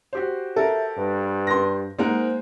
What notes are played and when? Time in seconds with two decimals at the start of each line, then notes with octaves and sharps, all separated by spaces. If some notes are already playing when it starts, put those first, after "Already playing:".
0.13 F#4 G4 C5
0.56 A4 A#4 E5
0.97 G2 B4
1.47 C6 A#6
1.98 G#3 A#3 D#4 A#4 C5 F#5